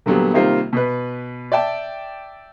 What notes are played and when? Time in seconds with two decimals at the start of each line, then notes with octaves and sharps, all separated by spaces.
0.06 A#2 D3 F#3 G3 B3
0.34 C3 D#3 G3 A#3 F4 C5
0.73 B2 B4
1.52 D5 E5 G5 A5